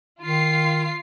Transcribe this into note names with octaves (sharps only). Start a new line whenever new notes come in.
D#3 F4 C7